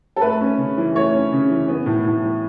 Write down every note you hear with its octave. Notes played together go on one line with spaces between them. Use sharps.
A4
A3 B4
C#4
C#3
E3
A3 C#5
C#4
C#3
E3
B3
A2
A2
E3